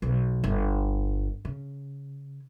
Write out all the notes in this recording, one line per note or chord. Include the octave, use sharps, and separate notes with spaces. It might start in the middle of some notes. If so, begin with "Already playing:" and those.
B1
G1
C#3